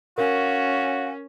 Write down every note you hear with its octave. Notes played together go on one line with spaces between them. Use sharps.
C#4 F#4 A#4 F5